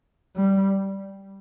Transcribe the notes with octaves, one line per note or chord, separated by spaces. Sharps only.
G3